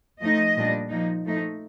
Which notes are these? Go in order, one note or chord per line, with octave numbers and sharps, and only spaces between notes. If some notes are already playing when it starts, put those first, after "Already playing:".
F3 A3 D#4 D#5
A#2 G3 D4
F3 A#3 D#4
F3 A3 D#4